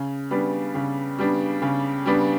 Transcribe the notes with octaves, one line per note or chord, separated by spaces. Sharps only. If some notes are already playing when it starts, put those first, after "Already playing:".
Already playing: C#3
G3 B3 D4
C#3
G3 B3 D4
C#3
G3 B3 D4